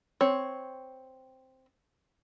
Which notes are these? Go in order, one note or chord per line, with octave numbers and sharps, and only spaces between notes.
C4 C#5